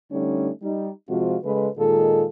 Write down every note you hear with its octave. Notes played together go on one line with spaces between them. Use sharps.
D3 G3 A3 C#4 D#4
G3 D#4
C3 F3 G#3 C4 F4 F#4
C#3 G#3 A4 B4
A#2 D#3 G#3 F4 G#4 A4